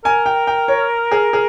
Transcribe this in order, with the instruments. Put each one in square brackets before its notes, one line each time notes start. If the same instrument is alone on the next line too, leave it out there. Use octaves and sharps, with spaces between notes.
[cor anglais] A#4 [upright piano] G#5
[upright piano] G5
G5
C#5
G#4
G#4